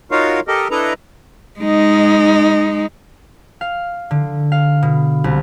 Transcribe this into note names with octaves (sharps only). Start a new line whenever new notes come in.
D#4 F4 F#4 A#4 C#5 F5
G4 A4 A#4 D#5
D4 E4 A4 B4 D#5 A#5
G#3 D#4
F5
D3
F5
B2
C2